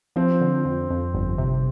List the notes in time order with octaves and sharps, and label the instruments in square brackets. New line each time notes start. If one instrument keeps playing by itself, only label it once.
[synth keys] F3 [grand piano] C4
[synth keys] D3
F2
F2
G1
C3